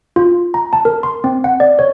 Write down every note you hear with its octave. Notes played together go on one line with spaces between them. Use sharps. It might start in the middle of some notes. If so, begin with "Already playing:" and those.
F4
A#5
A5
A#4
C6
C4
F#5
D5
C#5